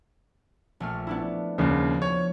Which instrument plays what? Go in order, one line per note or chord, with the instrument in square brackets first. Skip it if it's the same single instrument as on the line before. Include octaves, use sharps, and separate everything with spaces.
[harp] A#1 A3 F6
B3 D4 E4
[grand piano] D#2 C#3 [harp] F3 B3
[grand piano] C#5